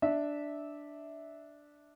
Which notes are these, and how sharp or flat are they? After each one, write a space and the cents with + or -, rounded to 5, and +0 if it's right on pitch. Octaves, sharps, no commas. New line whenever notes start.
D4 +0 E5 -15